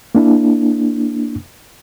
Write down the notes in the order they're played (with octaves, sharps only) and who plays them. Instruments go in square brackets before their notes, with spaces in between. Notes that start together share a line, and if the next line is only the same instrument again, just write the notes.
[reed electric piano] A#3 D4 E4